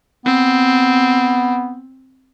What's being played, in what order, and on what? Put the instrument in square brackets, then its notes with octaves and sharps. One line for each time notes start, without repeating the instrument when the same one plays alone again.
[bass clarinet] B3 [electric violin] C4